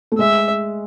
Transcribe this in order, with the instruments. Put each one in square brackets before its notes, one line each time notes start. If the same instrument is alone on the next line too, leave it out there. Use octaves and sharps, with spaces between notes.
[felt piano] A3
[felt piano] G#3 [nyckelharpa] E5